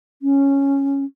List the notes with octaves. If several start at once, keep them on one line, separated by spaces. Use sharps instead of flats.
C#4